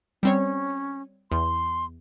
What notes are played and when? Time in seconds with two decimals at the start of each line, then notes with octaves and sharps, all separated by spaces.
0.23 G3 C4 C#4 C#5
1.32 E2 C6